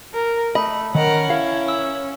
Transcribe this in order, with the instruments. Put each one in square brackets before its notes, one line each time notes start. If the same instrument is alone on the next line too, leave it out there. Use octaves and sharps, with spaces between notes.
[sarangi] A#4
[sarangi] A3 [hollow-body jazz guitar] D#5 [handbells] B5
[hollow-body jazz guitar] D#3 [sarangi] C#4 [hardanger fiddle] A#4 F#5
[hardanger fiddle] E4 [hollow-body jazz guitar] F5
[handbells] E6